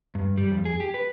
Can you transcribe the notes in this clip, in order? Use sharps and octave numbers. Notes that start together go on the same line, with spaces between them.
G2
G3
F2
G#4
G4
B4